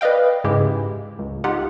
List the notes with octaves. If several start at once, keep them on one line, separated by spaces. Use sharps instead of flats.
B4 D5 D#5 F5 G5
G#2 C#3 G#3 E4 G4
C#2
D#4 F4 G4 F#5